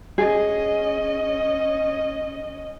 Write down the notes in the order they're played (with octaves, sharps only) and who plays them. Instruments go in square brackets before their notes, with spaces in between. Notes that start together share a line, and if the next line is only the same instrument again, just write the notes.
[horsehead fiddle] C#4 D#5 [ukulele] G#4